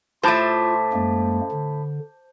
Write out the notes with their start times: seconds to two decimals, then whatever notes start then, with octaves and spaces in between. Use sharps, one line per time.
0.23 A2 A3 F4 C5 A5 D6
0.93 F#2 G#3 A#3
1.52 D3